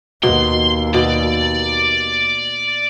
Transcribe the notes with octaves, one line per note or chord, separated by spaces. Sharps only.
D#2 B2 C6
B2 D5